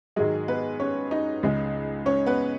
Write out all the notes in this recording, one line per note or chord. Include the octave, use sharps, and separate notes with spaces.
G#2 D#3 F#3 G#3 G#4
B3 B4
C#4 C#5
D#4 D#5
C#2 C#3 G#3
C#4 C#5
B3 B4